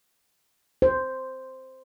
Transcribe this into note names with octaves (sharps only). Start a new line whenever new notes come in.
C5